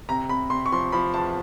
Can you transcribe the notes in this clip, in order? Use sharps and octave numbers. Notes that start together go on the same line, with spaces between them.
C3 A#5
C3 B5
C3 C6
C#6
F3 C6
F3 B5
E2 A5